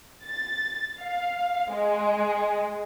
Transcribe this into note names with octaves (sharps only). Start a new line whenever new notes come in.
A6
F5
G#3